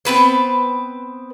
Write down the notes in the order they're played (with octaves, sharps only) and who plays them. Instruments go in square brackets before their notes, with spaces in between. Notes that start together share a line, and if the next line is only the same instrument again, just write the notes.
[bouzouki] B3 C4 B4 C5